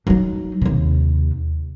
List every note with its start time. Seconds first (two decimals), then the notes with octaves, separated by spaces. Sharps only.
0.07 F#3 D#4
0.62 D#2 C3